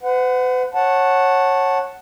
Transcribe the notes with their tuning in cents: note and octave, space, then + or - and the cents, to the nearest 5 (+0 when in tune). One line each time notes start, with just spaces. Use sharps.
B4 +45 F#5 +0
C#5 -15 F#5 +0 A5 +0